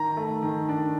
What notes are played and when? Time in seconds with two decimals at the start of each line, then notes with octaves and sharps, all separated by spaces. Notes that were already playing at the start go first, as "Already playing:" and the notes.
Already playing: D#3 A#5
0.17 A3
0.43 D#3
0.68 D4